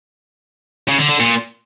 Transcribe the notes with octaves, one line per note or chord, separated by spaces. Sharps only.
C#3
D3
D3
A#2